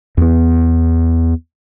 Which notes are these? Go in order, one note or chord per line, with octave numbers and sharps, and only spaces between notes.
E2 B3